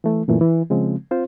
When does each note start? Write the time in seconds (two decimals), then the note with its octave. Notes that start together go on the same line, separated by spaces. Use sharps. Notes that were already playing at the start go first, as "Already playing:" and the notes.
0.04 E3 A3
0.28 F#2 A#2 E3 A3
0.41 E3
0.70 C#3 F3 G#3 C4
1.11 C4 F4 C5